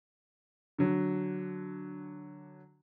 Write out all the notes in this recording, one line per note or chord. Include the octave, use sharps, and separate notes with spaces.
D3 F#3